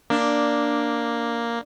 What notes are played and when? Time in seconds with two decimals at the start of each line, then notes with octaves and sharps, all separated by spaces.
0.10 A#3 D4